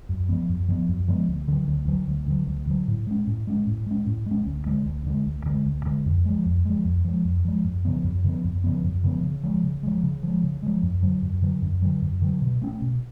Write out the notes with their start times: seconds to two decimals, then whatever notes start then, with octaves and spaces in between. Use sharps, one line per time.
0.09 F#2
0.29 F3 G#3 B3
0.49 F#2
0.68 F3 G#3 B3
0.89 F#2
1.08 F3 G#3 B3
1.28 D2
1.48 D3 F#3
1.68 D2
1.88 D3 F#3
2.08 D2
2.28 D3 F#3
2.47 D2
2.67 D3 F#3
2.88 A2
3.07 G#3 C#4
3.27 A2
3.47 G#3 C#4
3.67 A2
3.86 G#3 C#4
4.07 A2
4.26 G#3 C#4
4.46 D2
4.66 D3 G#3
4.86 D2
5.06 D3 G#3
5.26 D2
5.46 D3 G#3
5.65 D2
5.86 D3 G#3
6.05 F2
6.25 F3 G#3
6.45 F2
6.65 F3 G#3
6.85 F2
7.05 F3 G#3
7.25 F2
7.45 F3 G#3
7.64 F#2
7.85 C#3 F3 B3
8.04 F#2
8.24 C#3 F3 B3
8.44 F#2
8.64 C#3 F3 B3
8.84 F#2
9.04 C#3 F3 B3
9.23 C#3
9.43 F3 G#3
9.64 C#3
9.83 F3 G#3
10.03 C#3
10.23 F3 G#3
10.43 C#3
10.62 F3 G#3
10.83 F#2
11.03 D3 F#3
11.22 F#2
11.42 D3 F#3
11.62 F#2
11.82 D3 F#3
12.02 F#2
12.22 D3 F#3
12.42 B2
12.62 A3 C#4
12.82 B2